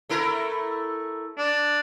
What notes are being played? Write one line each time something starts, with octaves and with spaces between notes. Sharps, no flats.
A3 E4 A#4
D4